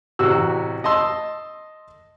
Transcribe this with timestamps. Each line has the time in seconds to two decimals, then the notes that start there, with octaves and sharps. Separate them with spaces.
0.19 A1 C3 F#4 E6
0.84 D#5 A5 C6 E6